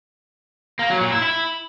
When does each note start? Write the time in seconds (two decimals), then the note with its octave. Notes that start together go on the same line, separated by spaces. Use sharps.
0.79 A#3
0.90 F#3
1.01 A#2
1.12 E4
1.22 E4